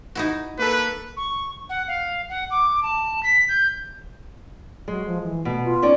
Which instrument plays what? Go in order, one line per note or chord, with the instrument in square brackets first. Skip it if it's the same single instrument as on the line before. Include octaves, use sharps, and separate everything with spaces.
[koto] D#4 E4 F#4
[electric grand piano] A#3 A4 [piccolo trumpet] B4
[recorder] C#6
F#5
F5
F#5
D6
A5
B6
G6
[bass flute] F#3 [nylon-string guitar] G#3
[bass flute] F3
E3
[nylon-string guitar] B2 [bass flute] A3
[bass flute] F4
[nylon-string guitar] C#4 D#4 D5